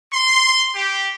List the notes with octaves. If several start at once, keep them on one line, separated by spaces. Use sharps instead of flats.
C6
G4